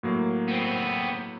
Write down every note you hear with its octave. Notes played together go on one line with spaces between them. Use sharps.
A2 F#3 A#3
B3 C4